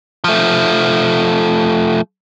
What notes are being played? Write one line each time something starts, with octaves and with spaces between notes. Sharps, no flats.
F3 A3